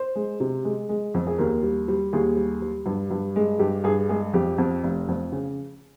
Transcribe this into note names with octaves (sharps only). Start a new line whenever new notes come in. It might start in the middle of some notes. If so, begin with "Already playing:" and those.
Already playing: C5
G#3
C3
G#3
G#3
F2
G#4
D#2 A#4
G3
G3
D#2 G#4
G3
G3
G2
G2
G#3
G2 G4
G2 G#4
G#3 G#4
F2 G4
F2
F1
F2
C#3